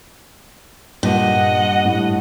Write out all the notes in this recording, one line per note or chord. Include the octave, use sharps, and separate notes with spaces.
G2 A#2 D#5 F#5
A2 G3